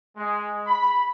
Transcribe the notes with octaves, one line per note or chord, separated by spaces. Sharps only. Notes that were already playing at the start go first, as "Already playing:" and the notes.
G#3
B5